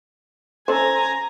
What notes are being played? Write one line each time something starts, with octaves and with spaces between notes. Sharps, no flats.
C#4 A4 C5 G#5 A#5